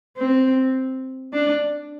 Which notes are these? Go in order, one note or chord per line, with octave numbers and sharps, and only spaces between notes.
C4
D4